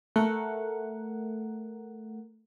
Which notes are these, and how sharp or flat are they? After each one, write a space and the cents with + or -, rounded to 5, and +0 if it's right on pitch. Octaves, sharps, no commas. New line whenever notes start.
A3 +0 A#4 +0 F#5 +0